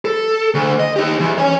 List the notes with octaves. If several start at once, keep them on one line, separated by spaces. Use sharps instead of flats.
A4
D2
D#5
D#4 G4
E2
C#5 G#5